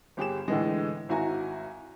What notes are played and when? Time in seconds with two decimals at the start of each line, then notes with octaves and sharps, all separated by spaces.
0.17 G1 G4 G#4 E7
0.48 A2 D3 E3 G#3
1.09 G#1 E4 F#4 G#5 A#5